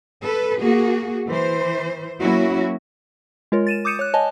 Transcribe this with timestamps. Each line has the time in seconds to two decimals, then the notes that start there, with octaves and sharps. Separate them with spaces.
0.24 A4 B4
0.62 A#3 F#4 G#4
1.27 E3 C5
2.21 F#3 A#3 C#4 E4 F#4
3.52 G#3 F4 A#4 C#5
3.67 A6 D#7 E7
3.85 D6 D#6 G6 C#7 D#7 E7
3.99 C#5 F#6
4.14 C#5 D#5 G#5 A5